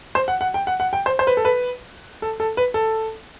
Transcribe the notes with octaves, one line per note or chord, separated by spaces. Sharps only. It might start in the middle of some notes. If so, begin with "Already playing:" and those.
C5
F#5
F#5
G5
F#5
F#5
G5
C5
C5
B4
A4
B4
A4
A4
B4
A4